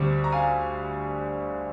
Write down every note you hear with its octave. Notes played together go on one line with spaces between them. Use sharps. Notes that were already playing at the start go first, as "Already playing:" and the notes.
Already playing: D2 D3 G3 C4
A#5
F5 G#5